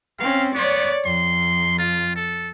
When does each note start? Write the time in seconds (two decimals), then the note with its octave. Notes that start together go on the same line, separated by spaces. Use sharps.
0.19 C4 C#4 F5
0.55 B3 C#5 D5
1.05 F2 C6
1.78 F4
2.16 A4